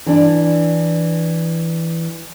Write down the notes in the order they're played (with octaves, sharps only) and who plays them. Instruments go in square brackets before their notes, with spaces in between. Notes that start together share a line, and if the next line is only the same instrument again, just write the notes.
[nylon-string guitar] E3 D4